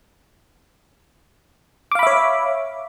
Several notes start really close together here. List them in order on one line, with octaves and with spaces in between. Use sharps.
D6 F5 B5 E5 C#5